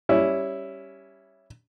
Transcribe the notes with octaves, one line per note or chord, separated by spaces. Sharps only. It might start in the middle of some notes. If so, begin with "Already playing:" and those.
G3 C#4 E4